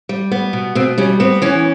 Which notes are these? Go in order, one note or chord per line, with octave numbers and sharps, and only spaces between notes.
G3
B3
B2
B2 C4
G3 C#4
B3 C4
E3 C#4